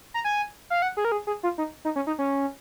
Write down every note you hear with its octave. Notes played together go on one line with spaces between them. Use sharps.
A#5
G#5
F5
F#5
G#4
A#4
G#4
G#4
F4
D#4
D#4
C#4
D#4
C#4